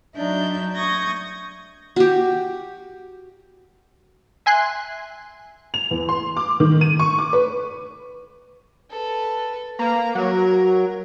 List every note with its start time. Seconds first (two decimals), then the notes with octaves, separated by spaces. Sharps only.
0.16 F#3 D4 D#4 E5 G6
0.75 C#6 D#6 G6 G#6 A#6
1.96 F#4 G4
4.46 E5 G#5 C6 F#6
5.74 F7
5.91 E2
6.09 C6
6.37 D6
6.60 D#3
6.81 D#7
6.99 C#6
7.18 D6
7.33 B4
8.90 A4 B4
9.79 A#3 B4 A#5
10.15 F#3 A#4